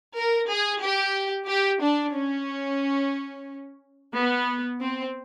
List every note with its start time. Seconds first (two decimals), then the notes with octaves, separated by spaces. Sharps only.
0.16 A#4
0.50 G#4
0.82 G4
1.49 G4
1.83 D4
2.16 C#4
4.15 B3
4.81 C4